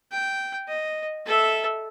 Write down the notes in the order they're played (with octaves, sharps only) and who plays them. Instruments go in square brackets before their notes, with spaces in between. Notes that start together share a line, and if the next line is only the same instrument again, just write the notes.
[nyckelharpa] G5
D#5
A4 E5